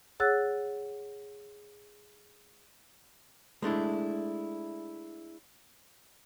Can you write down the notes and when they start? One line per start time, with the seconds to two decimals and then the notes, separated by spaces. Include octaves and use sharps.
0.20 G#4 C#5 F#5 E6 F#6 A6
3.62 G#3 A3 D4 E4